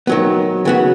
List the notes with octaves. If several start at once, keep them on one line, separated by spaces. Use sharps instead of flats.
D#3 F#3 B3
C#3 B3 F#4